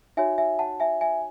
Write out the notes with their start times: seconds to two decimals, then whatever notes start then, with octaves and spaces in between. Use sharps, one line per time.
0.17 D#4 F#4 C#5 E5 G#5
0.38 E5 G#5
0.59 F#5 A5
0.80 E5 G#5
1.01 E5 G#5